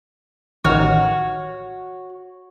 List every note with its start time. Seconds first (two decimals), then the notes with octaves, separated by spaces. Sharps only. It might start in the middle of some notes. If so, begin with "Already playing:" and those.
0.64 A1 D#3 F#4 C#5 F6